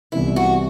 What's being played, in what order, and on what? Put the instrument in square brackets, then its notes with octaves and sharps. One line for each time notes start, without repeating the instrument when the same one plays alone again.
[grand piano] C2 C3 E3 B3 [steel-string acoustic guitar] E4
[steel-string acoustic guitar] F#4